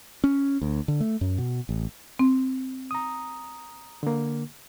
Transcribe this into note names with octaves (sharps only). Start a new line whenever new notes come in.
C#4
D2
D3
A3
F#2
B2
A1
C4
A#5 D#6
D3 A#3